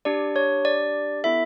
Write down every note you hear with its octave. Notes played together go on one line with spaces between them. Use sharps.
D4 G4 D5
C#5
D5
B3 E4 A4 E5